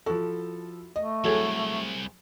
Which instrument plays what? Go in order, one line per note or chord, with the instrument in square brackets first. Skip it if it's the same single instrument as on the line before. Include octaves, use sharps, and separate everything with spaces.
[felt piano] F3 A4 [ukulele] E4 F#4
[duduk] A3 [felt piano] D#5
[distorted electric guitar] C2 [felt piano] F#3 G#4 [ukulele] E4 A4 C#5